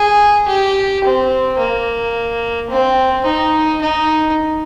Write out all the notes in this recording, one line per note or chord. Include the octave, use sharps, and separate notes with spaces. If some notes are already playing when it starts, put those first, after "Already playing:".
Already playing: G#4
G4
C4
A#3
C4
D#4
D#4